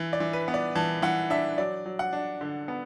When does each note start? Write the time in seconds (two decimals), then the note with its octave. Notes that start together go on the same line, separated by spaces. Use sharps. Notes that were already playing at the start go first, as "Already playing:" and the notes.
Already playing: E3
0.13 D5
0.20 E3
0.33 B4
0.48 B3
0.54 D5
0.75 E3 A5
1.02 E3 F#5
1.30 D4 E5
1.58 F#3 D5
1.86 F#3
1.99 F#5
2.13 D4
2.41 D3
2.68 B3